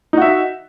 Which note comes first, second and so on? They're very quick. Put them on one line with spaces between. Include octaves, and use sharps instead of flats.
D#4 F#4 E5